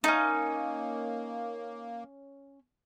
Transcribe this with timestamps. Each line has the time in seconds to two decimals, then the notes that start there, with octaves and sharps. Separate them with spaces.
0.04 A3 A#3 C#4 D#4